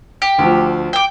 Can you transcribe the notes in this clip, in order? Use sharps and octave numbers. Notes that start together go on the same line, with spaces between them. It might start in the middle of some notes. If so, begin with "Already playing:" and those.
G4
D2 F3
G5 D6